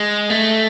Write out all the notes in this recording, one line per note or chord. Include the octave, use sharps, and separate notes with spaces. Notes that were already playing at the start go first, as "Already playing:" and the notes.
Already playing: G#3
A3